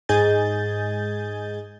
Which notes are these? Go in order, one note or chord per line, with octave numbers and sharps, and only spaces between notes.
G#2 G#4 D#5 G#5 G6 A6